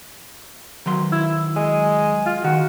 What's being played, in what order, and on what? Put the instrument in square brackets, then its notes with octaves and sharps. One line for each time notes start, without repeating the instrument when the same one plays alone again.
[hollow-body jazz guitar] D#3 F#3 C6
[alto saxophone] E4
G#3
F4
[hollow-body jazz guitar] D#3 [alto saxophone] F#4